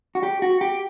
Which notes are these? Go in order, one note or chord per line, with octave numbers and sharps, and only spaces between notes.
F#4
G4
F#4
G4